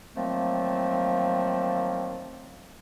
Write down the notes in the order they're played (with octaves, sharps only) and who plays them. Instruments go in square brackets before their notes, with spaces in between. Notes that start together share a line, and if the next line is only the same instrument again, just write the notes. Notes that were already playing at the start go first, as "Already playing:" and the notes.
[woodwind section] D#3 F3 F#3 A3 A#3 C4